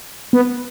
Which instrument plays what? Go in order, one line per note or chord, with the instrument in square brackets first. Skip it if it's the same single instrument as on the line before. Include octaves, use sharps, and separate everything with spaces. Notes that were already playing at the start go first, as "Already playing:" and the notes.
[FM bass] B3